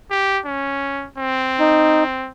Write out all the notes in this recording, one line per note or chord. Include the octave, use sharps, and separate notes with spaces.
G4
C#4
C4
D#4